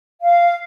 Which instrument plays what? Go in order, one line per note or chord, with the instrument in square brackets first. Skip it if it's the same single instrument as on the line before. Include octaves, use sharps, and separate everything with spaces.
[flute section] F5